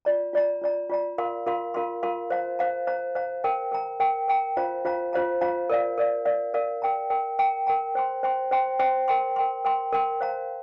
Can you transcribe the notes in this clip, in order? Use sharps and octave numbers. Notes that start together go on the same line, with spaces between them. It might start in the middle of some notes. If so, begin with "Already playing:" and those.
F4 D5 A#5
F4 D5 A#5
F4 D5 A#5
F4 D5 A#5
F4 A#4 F5 C6
F4 A#4 F5 C6
F4 A#4 F5 C6
F4 A#4 F5 C6
C5 F5 A#5
C5 F5 A#5
C5 F5 A#5
C5 F5 A#5
A#4 G5 A#5
A#4 G5 A#5
A#4 G5 A#5
A#4 G5 A#5
F4 C5 F5 A#5
F4 C5 F5 A#5
F4 C5 F5 A#5
F4 C5 F5 A#5
A#4 D5 F5
A#4 D5 F5
A#4 D5 F5
A#4 D5 F5
A#4 G5 A#5
A#4 G5 A#5
A#4 G5 A#5
A#4 G5 A#5
C5 G5 C6
C5 G5 C6
C5 G5 C6
C5 G5 C6
A#4 G5 C6
A#4 G5 C6
A#4 G5 C6
A#4 G5 C6
C5 F5 A#5